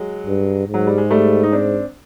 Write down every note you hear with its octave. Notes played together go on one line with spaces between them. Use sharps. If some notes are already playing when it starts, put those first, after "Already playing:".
Already playing: F#3 G#3
G2
G#2
F#3
G3
G#3
G3 A3
D#4
C4 D4